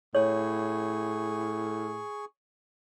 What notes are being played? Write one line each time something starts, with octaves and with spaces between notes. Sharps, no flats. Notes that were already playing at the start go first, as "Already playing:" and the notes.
A2 G#4 C#5 C#6